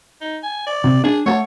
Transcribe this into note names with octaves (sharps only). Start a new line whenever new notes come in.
D#4
G#5
D5
C3
D4 G#4
A3 C#5 F#5 A5